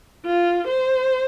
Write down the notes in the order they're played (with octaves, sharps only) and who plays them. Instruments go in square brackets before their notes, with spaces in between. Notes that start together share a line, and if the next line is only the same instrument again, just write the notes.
[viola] F4
C5